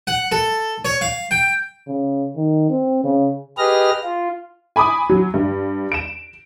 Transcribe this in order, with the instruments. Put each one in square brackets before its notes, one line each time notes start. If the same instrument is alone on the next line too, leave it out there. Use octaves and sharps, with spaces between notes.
[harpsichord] F#5
A4
C#5
F5
G5
[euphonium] C#3
D#3
C4
C#3
[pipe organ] G4 G#4 B4 D#5 F6 A#6
F4
[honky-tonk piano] G#5 B5 D6 D#6
F#3
G2
D7 E7